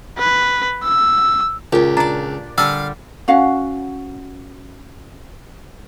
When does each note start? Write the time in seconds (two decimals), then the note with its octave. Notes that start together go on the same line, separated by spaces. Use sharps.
0.19 B4
0.84 E6
1.73 C#2 A#2 F4 G4 A#4
1.97 D4 D5 A#5
2.58 D3 G3 F5 E6
3.28 C#4 F#4 F5 F#5